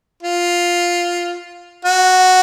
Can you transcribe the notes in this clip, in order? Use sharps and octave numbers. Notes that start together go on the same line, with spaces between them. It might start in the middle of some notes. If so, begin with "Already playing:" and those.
F4
F#4